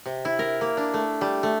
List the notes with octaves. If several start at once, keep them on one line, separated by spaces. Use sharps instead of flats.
C3
E4
A#4
A#3
D4
A3
G3
A3